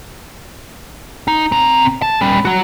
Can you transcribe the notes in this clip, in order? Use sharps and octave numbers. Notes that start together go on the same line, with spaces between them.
D#4
C4 A#5
A5
G3 C#4
F#3 F#4